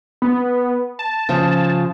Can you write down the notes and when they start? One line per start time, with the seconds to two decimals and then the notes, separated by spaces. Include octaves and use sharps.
0.22 B3
0.99 A5
1.29 C#3 F3